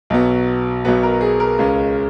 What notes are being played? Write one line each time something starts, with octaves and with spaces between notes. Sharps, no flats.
B1 B2 F#3 B3
B1 B2 F#3 B3 B4
A#4
G#4
A#4
C#2 C#3 G#3 C#4